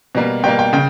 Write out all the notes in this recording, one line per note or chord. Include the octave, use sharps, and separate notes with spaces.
B2 G3 A#3
B2 G3 A#3 G5
G5
C#3 G5